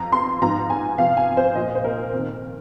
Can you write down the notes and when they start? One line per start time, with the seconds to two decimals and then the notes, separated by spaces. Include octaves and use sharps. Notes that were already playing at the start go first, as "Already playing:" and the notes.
Already playing: F2 F3 A#5
0.12 C6
0.42 G#2 F3 A#5
0.70 G#5
0.98 F2 C3 F3 F5
1.17 G#5
1.37 C5
1.55 A#2 F3 D#5
1.75 C5
1.84 A#4
2.13 F2 D#3